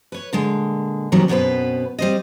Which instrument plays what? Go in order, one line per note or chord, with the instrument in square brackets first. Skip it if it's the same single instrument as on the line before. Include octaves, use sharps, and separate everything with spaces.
[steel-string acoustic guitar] B4 C#5
A#2 D3 G#3
D#2 C3 D#3 E3 F#3 G3
F#2 B2 B3 C4 B4
G3 C4 D#5